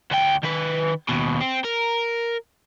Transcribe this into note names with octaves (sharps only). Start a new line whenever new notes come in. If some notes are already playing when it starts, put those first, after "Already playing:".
D2 G5
D#3 B4
D#2 B2
C4
A#4